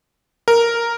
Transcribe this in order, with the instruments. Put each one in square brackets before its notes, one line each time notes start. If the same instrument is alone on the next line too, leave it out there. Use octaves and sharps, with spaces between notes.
[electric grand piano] A#4